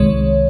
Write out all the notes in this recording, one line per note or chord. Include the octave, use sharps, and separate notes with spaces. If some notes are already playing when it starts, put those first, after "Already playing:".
Already playing: C2 C3 D#3 G#3 C#5